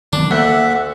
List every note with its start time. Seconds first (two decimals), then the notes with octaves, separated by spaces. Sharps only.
0.13 D#3 F#3 B3 D4
0.31 D2 A#3 E5 F#5